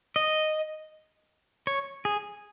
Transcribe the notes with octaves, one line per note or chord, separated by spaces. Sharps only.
D#5
C#5
G#4